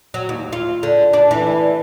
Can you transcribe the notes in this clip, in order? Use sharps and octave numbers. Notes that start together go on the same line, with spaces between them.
F#3
D#2
F4
D3
D4
E3